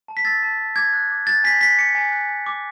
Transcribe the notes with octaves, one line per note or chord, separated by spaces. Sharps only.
A5
B6
E6 A6
A5
A5
D6 G#6
F#6
D6
F#6 A6
G#5 B6
F#6 B6
D6 C#7
G#5
F#6
G#5
D6